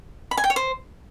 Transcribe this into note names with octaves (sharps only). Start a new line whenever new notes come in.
B5
G#5
G5
C#5
C5